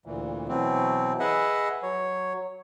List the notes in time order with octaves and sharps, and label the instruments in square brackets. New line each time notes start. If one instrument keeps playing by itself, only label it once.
[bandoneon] D2 A#2 E3
B2 E3 F#3 C4
G#4 B4 D#5 E5 F#5
F#3 C#5